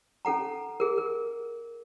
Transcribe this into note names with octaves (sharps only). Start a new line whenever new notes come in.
C#4 A4 F#5 A#5
G#4 A#4
A#4